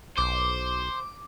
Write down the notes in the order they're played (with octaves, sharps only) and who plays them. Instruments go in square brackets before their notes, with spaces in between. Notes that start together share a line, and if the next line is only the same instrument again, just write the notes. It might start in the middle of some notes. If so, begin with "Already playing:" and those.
[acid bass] B1 [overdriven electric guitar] C5 [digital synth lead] D6